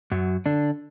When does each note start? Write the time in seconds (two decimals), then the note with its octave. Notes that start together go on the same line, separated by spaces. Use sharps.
0.11 F#2 F#3
0.46 D3 D4